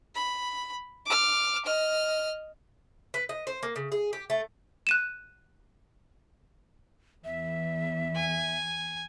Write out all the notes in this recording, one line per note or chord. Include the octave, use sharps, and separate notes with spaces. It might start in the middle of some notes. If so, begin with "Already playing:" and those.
B5
D6 F6
D#5 F6
B4
D#5
C5
A#3
C#3
G#4
G4
A3
F#6 D#7 E7
E2 E5
G#5